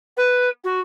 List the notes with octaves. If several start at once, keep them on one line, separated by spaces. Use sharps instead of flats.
B4
F#4